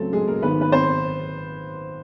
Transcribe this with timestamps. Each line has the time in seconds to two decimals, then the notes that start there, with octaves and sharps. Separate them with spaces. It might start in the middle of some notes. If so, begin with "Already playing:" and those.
Already playing: C#2 C#3 F#3 A3 C4 A4
0.13 G#3 G#4
0.27 A#3 A#4
0.42 G#1 G#2 D#3 B3 B4
0.61 B4
0.72 C4 C5